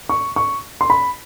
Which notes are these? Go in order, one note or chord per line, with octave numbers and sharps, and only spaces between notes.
C#6
C#6
C6
B5